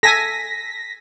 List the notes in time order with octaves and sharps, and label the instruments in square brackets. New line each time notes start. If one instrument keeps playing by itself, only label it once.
[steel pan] A4 G#5 [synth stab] A#6 B6